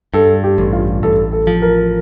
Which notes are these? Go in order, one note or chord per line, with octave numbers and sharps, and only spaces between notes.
G2 A4
G4
A1
F4
A1 A4
A4
F3
A#4